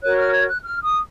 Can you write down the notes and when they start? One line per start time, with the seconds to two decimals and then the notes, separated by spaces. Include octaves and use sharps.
0.02 F#4 A#4 C#5 F#6
0.17 F6
0.33 G#6
0.48 F#6
0.63 F6
0.83 D#6